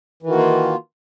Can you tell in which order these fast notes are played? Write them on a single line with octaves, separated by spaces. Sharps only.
E3 D#3 F#4 A#3 F4